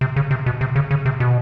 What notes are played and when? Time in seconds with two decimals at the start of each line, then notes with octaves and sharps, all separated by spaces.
0.01 C3
0.16 C#3
0.31 C3
0.46 B2
0.61 C3
0.76 C#3
0.91 C#3
1.06 C3
1.20 B2